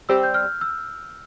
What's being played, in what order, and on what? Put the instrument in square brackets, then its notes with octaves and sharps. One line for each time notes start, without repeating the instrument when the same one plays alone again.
[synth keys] G3 C4 G4 [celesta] E6
[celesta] G6
F6
E6